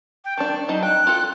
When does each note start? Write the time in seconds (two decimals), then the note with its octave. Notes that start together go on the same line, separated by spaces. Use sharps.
0.25 G5
0.38 D#3 D4 A5
0.69 F#3 D#4 D#5
0.83 G5 F#6
1.07 F4 A4